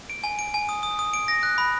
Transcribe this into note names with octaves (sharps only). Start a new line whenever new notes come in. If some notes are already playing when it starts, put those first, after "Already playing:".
D7
G#5
D7
G#5
D#6
D#6
D#6
D7
A#6
F#6
B5